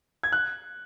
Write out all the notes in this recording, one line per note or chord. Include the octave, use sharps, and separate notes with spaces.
G#6
F#6